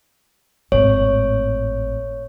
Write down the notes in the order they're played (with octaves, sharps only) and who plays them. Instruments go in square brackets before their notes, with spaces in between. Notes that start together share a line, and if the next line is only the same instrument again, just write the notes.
[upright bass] G#1 A2 [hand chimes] C#5